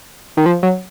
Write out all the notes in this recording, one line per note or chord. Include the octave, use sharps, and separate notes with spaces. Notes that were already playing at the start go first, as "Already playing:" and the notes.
D#3
F3
F#3